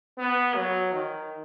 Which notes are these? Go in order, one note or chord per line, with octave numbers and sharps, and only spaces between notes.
B3
F#3
D#3